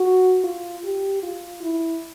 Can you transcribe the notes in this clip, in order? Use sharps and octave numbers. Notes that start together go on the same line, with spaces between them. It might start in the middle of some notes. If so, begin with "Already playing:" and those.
Already playing: F#4
F4
G4
F4
E4